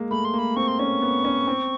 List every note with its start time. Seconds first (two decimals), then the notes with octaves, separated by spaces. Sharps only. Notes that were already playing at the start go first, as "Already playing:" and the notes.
Already playing: G#3 A#3
0.11 A3 B5
0.25 C6
0.34 A#3 B5
0.56 C4 C#6
0.68 C6
0.79 C#4 C#6
1.02 B3
1.25 C#4
1.47 C4